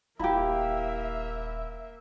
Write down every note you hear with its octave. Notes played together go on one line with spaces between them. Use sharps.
D#1 A#3 E4 G4 E5 F5 A#5 B5